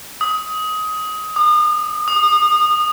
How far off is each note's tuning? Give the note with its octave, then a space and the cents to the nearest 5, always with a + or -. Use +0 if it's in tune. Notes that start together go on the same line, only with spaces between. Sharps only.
D#6 +20
D#6 -40
D#6 -25